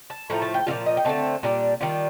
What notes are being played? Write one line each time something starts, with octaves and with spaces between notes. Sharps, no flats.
A5
A2 F3 A3 A#5
A5
G5
A#2 F3 C4 F4 F5
D#5
G5
D3 A3 C4 D#4 A5
A#2 G3 D4
D#3 G3 D4 F4